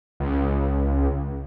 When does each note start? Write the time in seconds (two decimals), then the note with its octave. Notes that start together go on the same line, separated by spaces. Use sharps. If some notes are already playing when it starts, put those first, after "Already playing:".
0.20 C#2